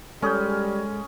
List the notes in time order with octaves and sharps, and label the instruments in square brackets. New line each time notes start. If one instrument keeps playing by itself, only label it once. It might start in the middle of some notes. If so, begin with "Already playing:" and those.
[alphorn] G3 [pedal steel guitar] G#3 G6 [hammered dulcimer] C#4 G#4 [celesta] A4